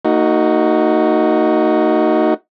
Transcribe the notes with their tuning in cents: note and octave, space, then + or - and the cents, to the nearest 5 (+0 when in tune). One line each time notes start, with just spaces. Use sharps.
A#3 -45 D#4 +0 F#4 +0